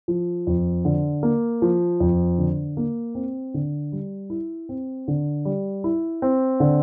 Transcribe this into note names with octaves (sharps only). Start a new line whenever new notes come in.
F3
F2
D3
A#3
F3
F2
D3
A#3
C4
D3
G3
E4
C4
D3
G3
E4
C4
D3